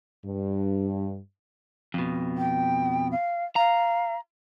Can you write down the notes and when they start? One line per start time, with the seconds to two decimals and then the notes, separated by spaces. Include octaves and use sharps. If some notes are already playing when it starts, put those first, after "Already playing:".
0.25 G2
1.94 F2 B2
2.37 G5
3.11 F5
3.56 F5 A#5